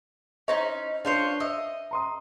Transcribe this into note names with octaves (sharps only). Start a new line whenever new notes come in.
C#4 D#4 E4 C5 D#5
D4 F4 C5 C#5
D#5 E5 E6
A#5 C6 D#6